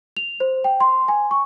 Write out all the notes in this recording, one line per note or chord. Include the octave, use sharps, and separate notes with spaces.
F7
C5
G5
C6
G#5
C#6